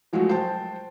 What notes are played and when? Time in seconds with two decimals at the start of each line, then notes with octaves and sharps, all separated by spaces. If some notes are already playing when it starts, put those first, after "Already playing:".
0.13 F3 F#3 G#3 A3 F#4
0.29 C5 G5 A5